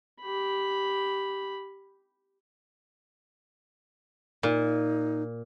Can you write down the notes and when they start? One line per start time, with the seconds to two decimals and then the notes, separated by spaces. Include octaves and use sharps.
0.22 G4 B5
4.43 A#2 D#4